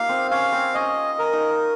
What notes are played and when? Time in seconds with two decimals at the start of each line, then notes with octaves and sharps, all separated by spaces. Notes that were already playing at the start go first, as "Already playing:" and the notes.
Already playing: A#3 D#4 F4 G4 F5
0.09 C4
0.31 C#4 F5
0.52 C4
0.75 C#4 D#5
1.19 A#4
1.33 D#4